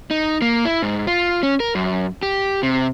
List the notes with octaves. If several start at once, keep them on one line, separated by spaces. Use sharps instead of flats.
D#4
A#3
E4
G#2
F4
C#4
A#4
F#2
G4
C3